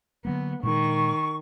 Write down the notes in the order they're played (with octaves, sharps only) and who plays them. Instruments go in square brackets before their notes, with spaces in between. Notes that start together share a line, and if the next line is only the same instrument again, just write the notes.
[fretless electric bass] D3 F#3 A#3 [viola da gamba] B3
[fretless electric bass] A#2 G#3 [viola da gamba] D#3 [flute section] C#6